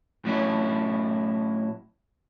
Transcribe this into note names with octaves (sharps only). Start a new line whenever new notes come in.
A2 F#3 C#4 E4